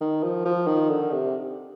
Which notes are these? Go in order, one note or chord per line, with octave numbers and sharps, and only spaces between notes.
D#3
F3
F3
D#3
D3
C3